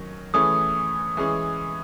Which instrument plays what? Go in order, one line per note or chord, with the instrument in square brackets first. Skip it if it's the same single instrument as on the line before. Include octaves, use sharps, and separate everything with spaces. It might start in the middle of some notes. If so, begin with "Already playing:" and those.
Already playing: [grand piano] D#3 F#3 C#4
[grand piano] E3 A3 C#4 G#4 [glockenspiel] D#6
[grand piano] E3 G#3 C#4 G#4